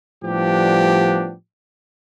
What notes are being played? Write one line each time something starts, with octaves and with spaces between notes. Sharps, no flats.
A2 F3 G3 B3 D4 G4